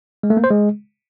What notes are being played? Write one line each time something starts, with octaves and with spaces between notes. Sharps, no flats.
G#3
A3
A#3
C5
G#3